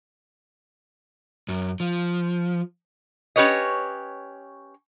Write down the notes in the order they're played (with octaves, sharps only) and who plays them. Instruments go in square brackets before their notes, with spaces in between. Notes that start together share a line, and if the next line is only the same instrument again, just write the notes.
[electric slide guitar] F#2
F3
[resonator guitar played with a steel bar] C#4 G4 B4 C#5 D#5